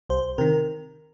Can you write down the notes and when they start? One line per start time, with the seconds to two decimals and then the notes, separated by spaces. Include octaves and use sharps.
0.09 C2 C5
0.38 C3 D#3 A#4